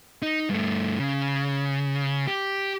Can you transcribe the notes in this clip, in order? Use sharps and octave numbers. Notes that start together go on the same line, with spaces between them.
D#4
G2 A3
C#3
G4